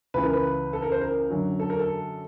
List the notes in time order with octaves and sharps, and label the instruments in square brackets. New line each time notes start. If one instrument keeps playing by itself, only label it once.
[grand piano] C#2 C#3 E3 [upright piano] B4
[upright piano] A#4
B4
A4
A#4
C5
A#4
[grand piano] F#2 D3 F#3
[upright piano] A4
A#4
A4